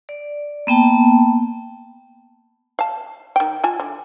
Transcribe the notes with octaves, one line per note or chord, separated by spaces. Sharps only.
D5
A#3 B3 G5 A5
F5 A5
D#3 G5
F4 G#5 A5
D3